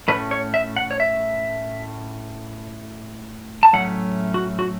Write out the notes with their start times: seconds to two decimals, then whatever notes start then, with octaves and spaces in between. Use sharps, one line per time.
0.08 A2 A3 C#4 B4
0.31 C#5
0.54 E5
0.76 F#5
0.91 C#5
1.00 E5
3.63 A5
3.73 A2 F#3 A3 C#4 F#5
4.34 F#4
4.59 F#4